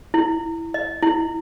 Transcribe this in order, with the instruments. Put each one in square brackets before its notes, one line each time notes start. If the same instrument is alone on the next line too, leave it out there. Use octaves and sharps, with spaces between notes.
[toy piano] E4
D#5
E4